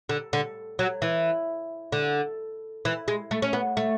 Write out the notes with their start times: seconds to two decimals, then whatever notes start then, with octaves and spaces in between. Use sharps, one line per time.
0.09 D3
0.33 D3
0.79 F#3
1.02 E3
1.92 D3
2.85 E3
3.08 G#3
3.31 A3
3.42 C#4
3.53 B3
3.77 A3